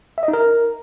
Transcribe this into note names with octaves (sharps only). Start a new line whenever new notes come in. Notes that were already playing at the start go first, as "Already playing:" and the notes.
E5
D#5
D#4
A#4